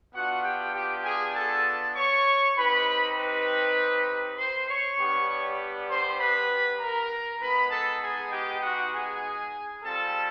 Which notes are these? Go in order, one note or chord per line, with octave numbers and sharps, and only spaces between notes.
B3 D4 F4 F#4 F#5
G4 G5
G4 G5
G#4 G#5
A4 A5
C#5 C#6
C4 D#4 G4 B4 B5
B4 B5
C5 C6
C#5 C#6
G3 B3 D4 G4
C5 C6
B4 B5
A#4 A#5
G#3 B3 D#4 B4 B5
A4 A5
G#4 G#5
G4 G5
F#4 F#5
G#4 G#5
G3 C4 F4 A4 A5